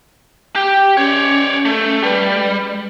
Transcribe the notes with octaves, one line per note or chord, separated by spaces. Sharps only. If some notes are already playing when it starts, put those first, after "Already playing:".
G4
C#4 C#5 D5
A3
G3 B4
G#3